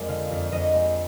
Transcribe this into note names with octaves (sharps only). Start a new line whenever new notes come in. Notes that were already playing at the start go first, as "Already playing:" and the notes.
Already playing: F2 G#3 A#4 D5
D3 F5
F2
F2 D#5
G#3